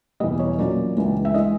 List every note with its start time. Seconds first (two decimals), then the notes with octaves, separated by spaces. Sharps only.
0.20 E2 B2 G3 D#5
0.39 C#5
0.58 A#2 F#3 A#3 C#4 F4 D5
0.97 C#2 C#3 E3 G#3 C#4
1.25 E5
1.34 E3 G#3 D#5